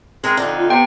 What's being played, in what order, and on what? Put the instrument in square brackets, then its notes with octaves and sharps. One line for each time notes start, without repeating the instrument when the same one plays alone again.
[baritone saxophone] G#3 [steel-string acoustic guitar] C4 A#4
[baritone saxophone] F2 [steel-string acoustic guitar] D3 D#4
[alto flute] F4
[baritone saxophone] C3 [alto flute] B3 [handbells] G5